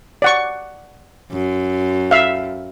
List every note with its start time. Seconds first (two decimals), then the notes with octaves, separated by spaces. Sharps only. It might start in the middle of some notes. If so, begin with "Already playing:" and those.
0.22 D5 F#5 C#6
1.32 F#2
2.11 E5 F5